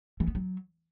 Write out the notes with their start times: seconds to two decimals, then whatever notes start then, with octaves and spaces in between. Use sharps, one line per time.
0.20 E3
0.28 B3
0.35 F#3